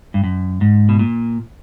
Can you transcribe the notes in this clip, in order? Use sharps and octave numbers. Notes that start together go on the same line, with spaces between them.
G2
F#2
G#2
B2
A#2